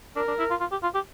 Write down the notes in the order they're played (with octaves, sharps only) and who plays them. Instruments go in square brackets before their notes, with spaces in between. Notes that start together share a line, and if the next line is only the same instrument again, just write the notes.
[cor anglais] D4 [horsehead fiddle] A#4
[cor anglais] D4
E4
F4
F4
G4
F4
G4